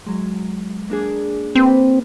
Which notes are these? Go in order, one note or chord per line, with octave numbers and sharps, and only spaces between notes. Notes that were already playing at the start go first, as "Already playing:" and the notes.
F#3 G#3
A#3 D4 G#4
A#3 C4 B4